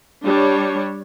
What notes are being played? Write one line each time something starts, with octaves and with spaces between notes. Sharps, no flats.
G3 D4 C#5